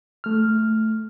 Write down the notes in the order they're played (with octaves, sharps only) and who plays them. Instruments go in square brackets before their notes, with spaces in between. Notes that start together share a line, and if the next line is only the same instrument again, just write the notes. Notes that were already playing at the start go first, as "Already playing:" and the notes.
[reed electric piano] A3 F6